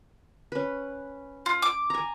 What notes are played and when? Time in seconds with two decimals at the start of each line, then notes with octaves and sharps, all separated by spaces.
0.52 C#4 B4
1.46 F4
1.62 D6
1.90 G#5 A#5